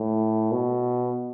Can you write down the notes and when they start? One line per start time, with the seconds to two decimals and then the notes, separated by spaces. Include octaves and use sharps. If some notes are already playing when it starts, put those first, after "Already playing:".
Already playing: A2
0.52 B2